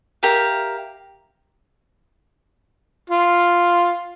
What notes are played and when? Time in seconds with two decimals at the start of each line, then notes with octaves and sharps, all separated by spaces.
0.23 G4 A#4 E5 F5
3.10 F4